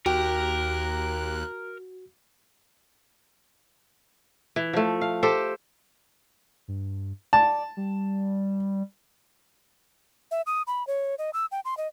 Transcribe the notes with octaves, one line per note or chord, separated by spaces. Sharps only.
D#2 F#4 G4 A#4 F#6
E3
F3 A3
F5
G4 A4 C5
G2
D5 A5
G3
E5
D#6
B5
C#5
D#5
E6
G5
C6
D#5